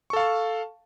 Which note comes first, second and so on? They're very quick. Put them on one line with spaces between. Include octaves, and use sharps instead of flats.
C#6 A4 F5 A5